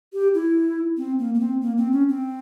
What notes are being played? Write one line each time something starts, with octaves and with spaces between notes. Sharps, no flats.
G4
E4
C4
A#3
A#3
C4
A#3
C4
C#4
C4